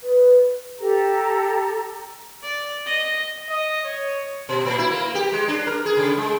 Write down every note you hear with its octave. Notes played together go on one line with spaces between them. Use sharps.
B4
G4 A4 A#5
D5
D#5
D#5
C#5
B2
A#2
E4
A#3
G4
G#3
D4
A#4
G#4
C#3
G#3